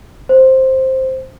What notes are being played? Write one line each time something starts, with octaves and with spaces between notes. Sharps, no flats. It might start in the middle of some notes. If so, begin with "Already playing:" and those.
C5